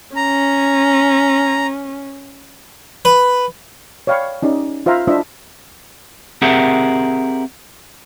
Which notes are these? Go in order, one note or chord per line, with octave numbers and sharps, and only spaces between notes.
C#4 A#5
B4
C#5 D5 F5 G5 B5 C#6
C#4 D#4 G4 D5
F4 C5 E5 F5 A#5
D4 E4 F4 C5 D#5 E5
C4 G4 G#4 A#4 E5 F#5